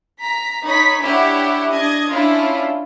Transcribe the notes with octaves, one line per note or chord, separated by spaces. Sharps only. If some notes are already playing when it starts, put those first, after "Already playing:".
A#5 B6
D#4 C#5 B5 B6
D4 E4 G4 C#5 F#5
D4 D#5 G#6
C#4 D4 E4 F4